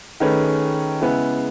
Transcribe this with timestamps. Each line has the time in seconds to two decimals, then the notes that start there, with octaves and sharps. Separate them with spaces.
0.20 D#3 A3 C#4 G#4 B4
1.01 C#3 G#3 B3 E4 G#4